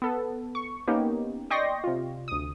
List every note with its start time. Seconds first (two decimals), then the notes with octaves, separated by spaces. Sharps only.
0.02 B3 A4
0.55 C#6
0.88 A#3 B3 C#4 D#4 G4
1.50 D5 D#5 G5 C6 C#6 A#6
1.84 C3 F4
2.28 D2 D#6